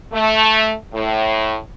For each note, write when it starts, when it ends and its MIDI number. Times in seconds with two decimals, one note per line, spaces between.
0.12 0.73 57
0.94 1.56 45